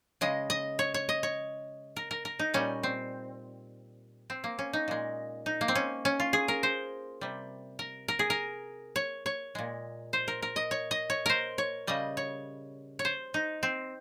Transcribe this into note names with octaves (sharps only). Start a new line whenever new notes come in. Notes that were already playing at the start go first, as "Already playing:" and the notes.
C#3 G#3 D#5
D#5
C#5
C#5
D#5
C#5
A#4
A#4
A#4
D#4
A#2 G3 C#4
C4
C4
A#3
C#4
D#4
A#2 G#3
D#4
A#3
C4
C#4
C#4
F4
G#4
A#4
C5
C3 G3
A#4
A#4
G#4
A#4
C#5
C#5
A#2 G#3
C5
A#4
A#4
D#5
C#5
D#5
C#5
A#4 C5
C#5
C#3 G3 D#5
C#5
C#5
C5
D#4
C4